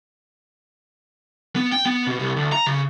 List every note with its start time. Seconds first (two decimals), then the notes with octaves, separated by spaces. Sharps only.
1.56 B3
1.72 G5
1.86 B3
2.07 B2
2.20 C2
2.36 D2
2.52 A#5
2.66 C#3